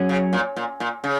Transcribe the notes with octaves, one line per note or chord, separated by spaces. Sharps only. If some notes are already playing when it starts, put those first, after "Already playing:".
Already playing: F#3 C#4 G#4
C#3
A#2
A#2
A#2
C#3